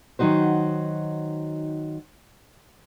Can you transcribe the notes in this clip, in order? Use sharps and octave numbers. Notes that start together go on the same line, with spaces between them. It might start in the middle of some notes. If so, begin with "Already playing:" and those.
D#3 F#3 D#4 F#4 C5